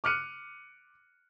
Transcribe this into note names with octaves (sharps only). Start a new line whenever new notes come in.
D6 F6 F#6 C#7 D#7